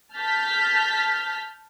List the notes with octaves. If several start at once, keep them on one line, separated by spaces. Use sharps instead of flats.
A5 F6 G6 A6 B6